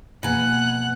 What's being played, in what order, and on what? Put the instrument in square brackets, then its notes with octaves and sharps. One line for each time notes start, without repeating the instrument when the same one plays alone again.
[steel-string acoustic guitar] B2 G#5 [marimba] F3 A#3 B3 [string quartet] F#5 F#6